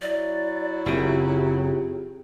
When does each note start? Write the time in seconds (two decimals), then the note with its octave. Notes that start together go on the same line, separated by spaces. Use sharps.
0.02 F#3 E4 D5
0.86 F#1 C#3 C4 F4 G4 G#4